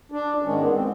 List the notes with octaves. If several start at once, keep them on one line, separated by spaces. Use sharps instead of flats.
D4
G#2 D#3 G#3 C#4
B3
C4